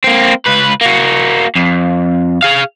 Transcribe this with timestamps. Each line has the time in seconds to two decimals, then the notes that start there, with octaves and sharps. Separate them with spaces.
0.04 A#3 C4
0.47 C#2 B4
0.81 A#3 F#4
1.55 F2
2.42 G#4 F5